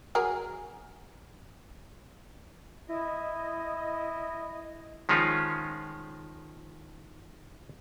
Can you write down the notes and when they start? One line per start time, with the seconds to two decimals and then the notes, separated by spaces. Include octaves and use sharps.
0.15 F#3 G#4 A#4
2.89 E4 D#5
5.09 D#3 F3 G#3 C#4 F4